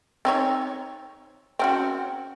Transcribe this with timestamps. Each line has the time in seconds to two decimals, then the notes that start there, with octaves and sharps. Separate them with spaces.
0.25 C4 D#4 C#5
1.59 C4 C#4 F#4